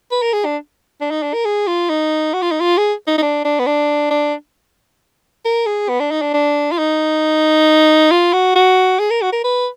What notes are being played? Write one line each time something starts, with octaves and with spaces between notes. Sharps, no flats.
B4
A#4
G#4
D4
D4
D#4
D4
A#4
G#4
F4
D#4
F#4
F4
D#4
F4
G#4
D#4
D#4
D4
D4
B3
D4
D4
A#4
G#4
B3
D4
D#4
D4
D4
F4
D#4
F4
F#4
F#4
G#4
A#4
F#4
A#4
B4